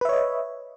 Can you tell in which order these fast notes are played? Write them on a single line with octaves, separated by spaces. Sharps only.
B4 E5 C#5 D#5